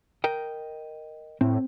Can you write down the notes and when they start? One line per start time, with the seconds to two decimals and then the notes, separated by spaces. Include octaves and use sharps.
0.24 A#4 D#5 G5
1.41 A2 C4